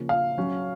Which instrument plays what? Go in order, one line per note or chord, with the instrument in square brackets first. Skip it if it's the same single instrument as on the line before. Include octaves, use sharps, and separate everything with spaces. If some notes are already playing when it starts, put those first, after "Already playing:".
Already playing: [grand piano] C#3 F3 A#3 C#4
[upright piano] F5
[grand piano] F#3 C#4 F#4